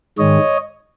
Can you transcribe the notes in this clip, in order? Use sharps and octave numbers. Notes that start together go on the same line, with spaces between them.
G#2 D#3 G#3 C#5 D#5